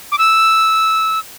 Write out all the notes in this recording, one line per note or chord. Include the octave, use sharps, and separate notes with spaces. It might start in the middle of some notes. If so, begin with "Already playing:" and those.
D6
E6